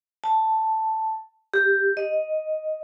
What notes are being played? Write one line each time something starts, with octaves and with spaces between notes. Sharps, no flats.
A5
G4
D#5